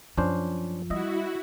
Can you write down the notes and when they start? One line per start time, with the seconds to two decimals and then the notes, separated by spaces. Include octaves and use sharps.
0.17 F#2 F3 C#4 D4 C5
0.90 G3 E4 F#4 D#5 E5